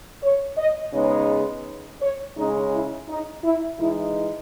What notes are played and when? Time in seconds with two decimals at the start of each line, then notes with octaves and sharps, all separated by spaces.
0.23 C#5
0.58 D#5
0.93 C#3 G#3 B3 D#4 C#5
2.02 C#5
2.37 C#3 G#3 C#4 D#4
2.73 E4
3.09 D#4
3.44 E4
3.79 E3 G#3 D#4 E4